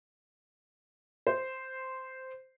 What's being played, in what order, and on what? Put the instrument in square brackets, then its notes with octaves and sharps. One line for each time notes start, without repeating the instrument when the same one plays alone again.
[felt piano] C5